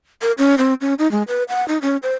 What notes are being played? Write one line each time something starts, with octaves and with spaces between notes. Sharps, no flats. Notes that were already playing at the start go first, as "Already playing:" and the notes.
A#4
C#4
C4
C#4
D#4
G#3
B4
F#5
D#4
C#4
C5